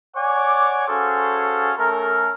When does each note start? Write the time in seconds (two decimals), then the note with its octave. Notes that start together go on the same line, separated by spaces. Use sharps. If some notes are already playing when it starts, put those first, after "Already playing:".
0.16 C#5 D5 F#5 G#5 D6
0.88 C#4 F#4 G#4 A4 C5 F5
1.79 A3 C#4 A4 A#4